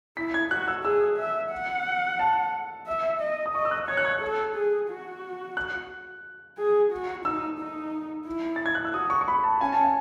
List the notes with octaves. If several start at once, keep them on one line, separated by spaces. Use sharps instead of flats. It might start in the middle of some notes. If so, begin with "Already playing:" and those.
E4 B6
G#6
F#4 F#6
E6
G#4 E6
E5
F#5
A5
E5
D#5
D#6
D#5 C#6
E6
F#6
C#5 G#6
F#6
G#6
A4
G#4
F#4
F#6
G#4
F#4
D#4 E6
D#4
E4
A6
G#6
F#6
E6
F#4 D#6
C#6
C#6
B5
A5
C#4 G#5
A5
G#5